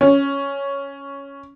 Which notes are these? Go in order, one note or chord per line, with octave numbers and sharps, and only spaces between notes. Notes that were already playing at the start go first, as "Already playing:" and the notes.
C#4